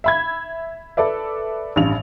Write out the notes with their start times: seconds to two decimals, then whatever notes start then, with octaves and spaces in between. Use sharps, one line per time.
0.04 E5 B5 G#6
0.97 A4 B4 D5 E5
1.76 A1 G2 F7